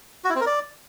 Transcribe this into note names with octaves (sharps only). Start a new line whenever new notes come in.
F#4
E4
C4
A#4
D5